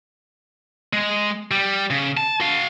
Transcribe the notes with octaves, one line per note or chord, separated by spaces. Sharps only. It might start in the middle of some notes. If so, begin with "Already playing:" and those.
G#3
G3
C#3
A5
F#4 F5